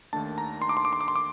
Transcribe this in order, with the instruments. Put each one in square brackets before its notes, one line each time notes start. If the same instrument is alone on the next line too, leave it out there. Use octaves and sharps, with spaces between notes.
[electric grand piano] D#2 D#3 A3 D4 A5
A#5
C6
D6
C6
D6
C6
D6
C6
D6